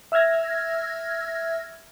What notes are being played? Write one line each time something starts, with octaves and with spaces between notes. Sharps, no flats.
E5 E6 F6 G#6 A#6